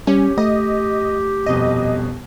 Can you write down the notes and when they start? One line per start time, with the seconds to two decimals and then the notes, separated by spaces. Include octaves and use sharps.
0.07 G3 C#4 G4
0.38 A3 D#5
1.46 D#1 F2 B2 D#5